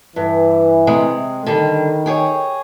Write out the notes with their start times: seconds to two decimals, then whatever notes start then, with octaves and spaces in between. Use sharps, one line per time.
0.16 G2 E3
0.87 C3 G#3
1.46 D3 D#3 G3
2.06 G4 G#4 C#5